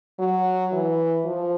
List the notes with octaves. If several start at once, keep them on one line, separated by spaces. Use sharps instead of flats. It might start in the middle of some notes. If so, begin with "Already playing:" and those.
F#3
E3
F3